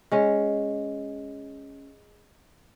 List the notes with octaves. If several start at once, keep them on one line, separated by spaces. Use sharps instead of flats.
G#3 C#4